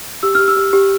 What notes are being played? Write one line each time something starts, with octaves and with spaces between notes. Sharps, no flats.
G4 E6
G4 F6
E6
G4
G4